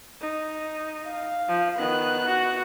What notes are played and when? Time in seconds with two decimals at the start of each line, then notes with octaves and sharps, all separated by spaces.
0.21 D#4
1.07 F5
1.48 F3
1.78 D#3 B3 F#6
2.27 F#4